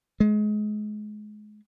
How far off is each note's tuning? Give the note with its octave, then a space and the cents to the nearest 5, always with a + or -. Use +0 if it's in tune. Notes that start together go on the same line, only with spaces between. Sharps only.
G#3 +30